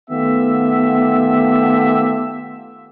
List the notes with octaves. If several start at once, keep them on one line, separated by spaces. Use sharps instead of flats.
D#3 A3 B3 F4 G4 E5